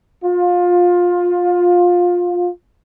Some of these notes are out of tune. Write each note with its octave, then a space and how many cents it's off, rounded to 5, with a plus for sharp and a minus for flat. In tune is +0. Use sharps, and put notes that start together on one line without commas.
F4 +20